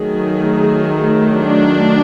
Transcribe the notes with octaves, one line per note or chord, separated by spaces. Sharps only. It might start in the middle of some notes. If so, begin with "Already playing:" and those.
Already playing: D#3 F#3 A3 G#4
D4